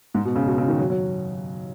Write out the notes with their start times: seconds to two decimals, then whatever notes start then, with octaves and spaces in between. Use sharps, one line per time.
0.14 G#2
0.25 B2
0.36 C#3
0.47 B2
0.58 C#3
0.68 D#3
0.79 F#3
0.90 F#3